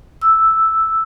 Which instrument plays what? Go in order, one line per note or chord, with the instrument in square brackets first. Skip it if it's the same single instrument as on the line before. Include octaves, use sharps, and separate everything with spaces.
[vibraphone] E6